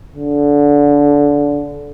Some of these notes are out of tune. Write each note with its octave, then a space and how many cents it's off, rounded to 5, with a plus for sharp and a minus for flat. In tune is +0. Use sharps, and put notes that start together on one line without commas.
D3 -20